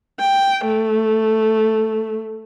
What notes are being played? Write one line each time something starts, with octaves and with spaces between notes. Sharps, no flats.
G5
A3